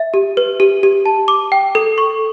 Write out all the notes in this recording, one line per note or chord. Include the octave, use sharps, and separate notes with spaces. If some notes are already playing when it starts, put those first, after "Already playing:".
Already playing: E5
G4
B4
G4
G4
A5
D6
G5
A4
C#6